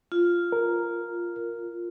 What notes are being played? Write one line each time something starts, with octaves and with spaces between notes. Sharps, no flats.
F4
A#4